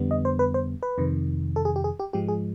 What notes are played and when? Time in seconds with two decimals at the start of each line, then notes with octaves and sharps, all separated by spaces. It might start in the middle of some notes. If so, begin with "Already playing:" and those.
Already playing: F2 D3 G3 B3
0.11 D#5
0.25 C5
0.39 B4
0.54 C5
0.83 B4
0.98 F2 C3 D#3
1.56 A4
1.65 G#4
1.76 G4
1.84 G#4
1.99 G4
2.13 G#2 F3 G#3 G4
2.28 G#4